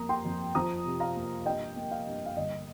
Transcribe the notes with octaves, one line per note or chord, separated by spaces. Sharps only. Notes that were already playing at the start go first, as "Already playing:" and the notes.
Already playing: F2 A#3 A#5 D#6
G5 C6
F2
F3 A#5 D#6
C3
F5 A#5
A#3
G2 D#5 G5
A#3
F5
G2
F5
G1 D#5